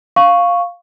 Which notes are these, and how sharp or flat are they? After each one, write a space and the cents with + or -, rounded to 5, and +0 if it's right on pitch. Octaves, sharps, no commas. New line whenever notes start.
F5 +5 C#6 +0